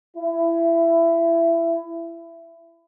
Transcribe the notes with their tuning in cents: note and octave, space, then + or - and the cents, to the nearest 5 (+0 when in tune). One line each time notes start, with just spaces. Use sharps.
E4 +20